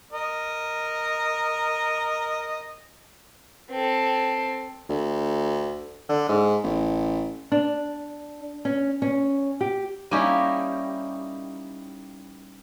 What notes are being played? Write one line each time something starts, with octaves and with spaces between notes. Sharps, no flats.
A#4 D#5
C4 A4
D2
D3
G#2
A1
D4
C#4
C#4
G4
G3 A#3 C#4 D#4 E4 G4